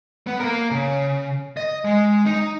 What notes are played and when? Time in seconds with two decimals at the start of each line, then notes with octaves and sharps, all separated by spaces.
0.27 B3
0.40 A#3 A#4
0.71 C#3
1.57 D#5
1.85 G#3
2.26 D#4